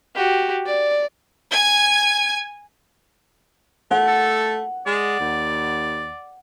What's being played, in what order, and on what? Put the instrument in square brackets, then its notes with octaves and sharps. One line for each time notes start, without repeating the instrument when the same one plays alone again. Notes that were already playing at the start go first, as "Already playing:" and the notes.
[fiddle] F#4 G4
D5
[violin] G#5 G#6
[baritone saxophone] A3 [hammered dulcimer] F#5
[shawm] A4
[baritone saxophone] G#3 [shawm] D5
[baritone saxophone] D#2